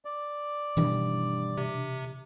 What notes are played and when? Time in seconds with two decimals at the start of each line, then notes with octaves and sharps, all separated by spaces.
0.05 D5
0.77 G2 B2 D#3 E3
1.57 C3